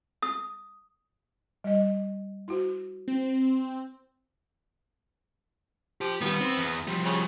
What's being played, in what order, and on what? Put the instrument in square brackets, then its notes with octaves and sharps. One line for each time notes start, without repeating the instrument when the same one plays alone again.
[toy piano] D#6
[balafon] G3 D#5
E4 F#4 C5
[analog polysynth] C4
[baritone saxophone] F3 [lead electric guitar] G4
[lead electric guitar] D#3 G3 [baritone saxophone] B3
[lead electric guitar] C4
E2
F3 G3
[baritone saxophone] C#3